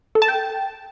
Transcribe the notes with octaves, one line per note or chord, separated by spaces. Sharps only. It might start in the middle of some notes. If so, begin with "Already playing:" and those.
A4
A5
G5